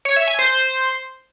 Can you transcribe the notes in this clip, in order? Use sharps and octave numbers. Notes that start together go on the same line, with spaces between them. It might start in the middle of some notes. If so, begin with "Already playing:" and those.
C#5
E5
G#5
C5